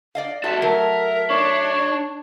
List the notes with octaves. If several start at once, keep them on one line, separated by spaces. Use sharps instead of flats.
D5 D#5 F5
C2 F#4 E5 A5
F#3 A3 A#4
D4 C#5